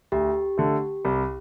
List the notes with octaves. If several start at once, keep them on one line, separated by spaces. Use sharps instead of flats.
D2 G4
D3 A3
C2